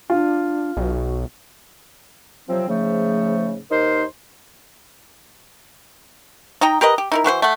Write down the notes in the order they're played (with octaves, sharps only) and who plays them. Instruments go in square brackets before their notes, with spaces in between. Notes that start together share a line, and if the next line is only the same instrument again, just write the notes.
[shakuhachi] D4 [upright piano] F4
[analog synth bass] B1 [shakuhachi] F#4
[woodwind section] C3 F3 F#3 C4
G#2 C#3 F3 A3
D#2 D#4 A#4 C5 C6
[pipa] D#4 D#5 G5 A#5
G4 A#4 B4 D#5
G4
D#4 E4 A#4
E3 F#4 B4 C5
A3 F#5